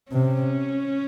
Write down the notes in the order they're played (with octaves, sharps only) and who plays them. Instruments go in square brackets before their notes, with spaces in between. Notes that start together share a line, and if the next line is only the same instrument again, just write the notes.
[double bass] C3 [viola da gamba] C#4